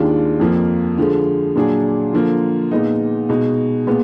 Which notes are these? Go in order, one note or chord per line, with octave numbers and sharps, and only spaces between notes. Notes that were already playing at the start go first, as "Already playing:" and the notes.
Already playing: D#2 D#3 G#3 D4 F4
F2 F3 A#3
D3 F3 G#3
A#2 F#3 D4 G#4
D3 F3 A#3 F4
A#2 G#3 B3 D#4
B2 G#3 D#4
A#2 G#3 B3